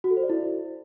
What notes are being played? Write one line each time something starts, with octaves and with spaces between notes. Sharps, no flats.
F#4
A4
C5
D5
E4